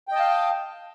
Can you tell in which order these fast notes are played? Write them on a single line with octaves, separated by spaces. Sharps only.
G5 D#5 A5 F5